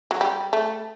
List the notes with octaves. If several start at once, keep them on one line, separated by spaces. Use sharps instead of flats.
F#3
G3
A3